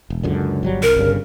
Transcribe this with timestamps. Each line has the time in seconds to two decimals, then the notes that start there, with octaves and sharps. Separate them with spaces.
0.10 E1
0.23 C#2 F#2 D3
0.63 G1 F#3 G3
0.83 C2 A#4
0.97 G1 G2 C#3